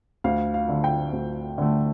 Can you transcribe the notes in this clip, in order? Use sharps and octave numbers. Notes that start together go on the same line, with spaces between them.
D2 F5
F5
D3 A3
G5
D2
D3 A3